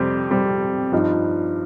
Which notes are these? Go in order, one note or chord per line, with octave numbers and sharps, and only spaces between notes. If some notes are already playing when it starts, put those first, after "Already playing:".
Already playing: F2 C3 G3 C4
F2 C3 G3 C4
G2 F3 D#4